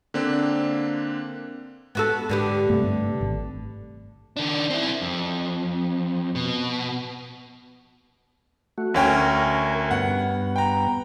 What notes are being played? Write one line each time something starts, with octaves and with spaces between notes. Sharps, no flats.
D3 A#3 C4 D4
B3 F#4 A4
G#2 D3 B3 G4
G2 C3 A3
G#1
D#3 D4
C4 E4
F2
B2
A3 F#4
D2 C#4 A#4 G5 G#5
G2 B3 F#5
G5 A#5